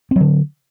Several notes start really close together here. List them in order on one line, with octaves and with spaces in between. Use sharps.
C4 F#3 D3